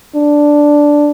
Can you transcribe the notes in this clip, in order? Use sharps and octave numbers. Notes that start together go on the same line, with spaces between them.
D4